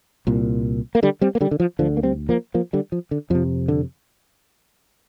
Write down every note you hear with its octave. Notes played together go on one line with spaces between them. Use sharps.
C2 A#2
A#3
D3 G3
G3 C4
A#3
D3 G3
D3
F3
D2 D3 F3
A#3
G3 C4
F3 A#3
F3 A#3
D3 G3
F3
D3
F2 C3 F3
D3